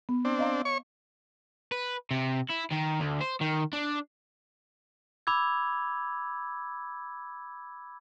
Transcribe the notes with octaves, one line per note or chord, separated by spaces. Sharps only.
B3
C4 D4
D#5 F5 A#5
C#5 C#6
B4
C3
E4
D#3
D2
C5
D#3
D4
B5 D6 E6 G#6